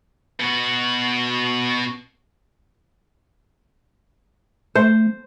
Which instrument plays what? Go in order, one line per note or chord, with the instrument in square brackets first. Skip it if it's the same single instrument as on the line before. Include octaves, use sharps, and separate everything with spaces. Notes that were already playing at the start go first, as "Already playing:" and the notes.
[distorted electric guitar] B2 F#4
[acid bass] A3 [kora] C5